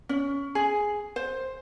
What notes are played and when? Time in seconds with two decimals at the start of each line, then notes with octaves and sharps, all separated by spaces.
0.09 C#4
0.55 G#4
1.16 C5